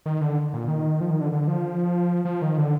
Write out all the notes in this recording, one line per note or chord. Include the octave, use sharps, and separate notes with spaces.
D#3
D3
A#2
D#3
F3
D#3
D3
D3
F3
F3
D#3
D3